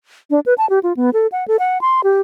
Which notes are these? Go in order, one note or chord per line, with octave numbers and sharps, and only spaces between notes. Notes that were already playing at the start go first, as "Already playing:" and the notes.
D4
B4
A5
G4
F4
B3
A4
F#5
A4
F#5
C6
G4